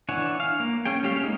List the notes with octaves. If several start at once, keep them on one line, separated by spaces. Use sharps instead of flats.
E3 D4 C#5 F#5 G#5
F5
A#3
C#4 G#4 G5
G3 A3 C#4 G4 F5
G#3 A#3 D#4